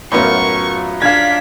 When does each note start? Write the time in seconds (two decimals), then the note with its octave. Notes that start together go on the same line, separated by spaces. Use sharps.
0.12 F#2 A2 B3 F4 A#5 C#6
1.02 D4 F5 G#6 B6